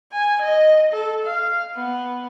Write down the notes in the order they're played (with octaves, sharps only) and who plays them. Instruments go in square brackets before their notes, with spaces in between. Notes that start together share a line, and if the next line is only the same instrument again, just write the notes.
[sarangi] G#5
D#5
A4
F5
B3